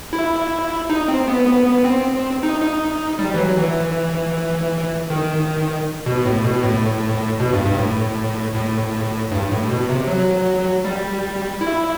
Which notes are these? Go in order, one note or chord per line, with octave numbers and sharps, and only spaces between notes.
E4
D#4
C4
B3
B3
B3
C4
D#4
D#4
G3
E3
F#3
E3
D#3
B2
A2
B2
A2
B2
G2
G2
A2
A2
G2
A2
B2
C3
F#3
G3
E4